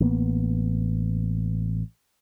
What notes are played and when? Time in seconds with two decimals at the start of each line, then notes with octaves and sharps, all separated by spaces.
0.01 A1 A#3 B3